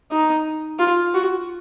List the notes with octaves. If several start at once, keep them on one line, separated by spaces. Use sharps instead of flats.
D#4
F4
F#4